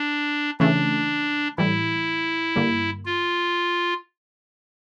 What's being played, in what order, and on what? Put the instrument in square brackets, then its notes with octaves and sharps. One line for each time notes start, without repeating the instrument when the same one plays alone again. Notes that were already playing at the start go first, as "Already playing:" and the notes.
Already playing: [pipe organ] D4
[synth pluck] C#3 E3 A3 C#4 [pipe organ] D4
[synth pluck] A2 E3 G3 [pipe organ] E4
[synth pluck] G2 D3 G3 A#3
[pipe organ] F4